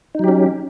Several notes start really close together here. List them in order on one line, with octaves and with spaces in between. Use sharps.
D#4 F#3 G4 C#4